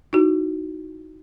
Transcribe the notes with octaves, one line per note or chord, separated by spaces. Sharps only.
D#4 E4 F#4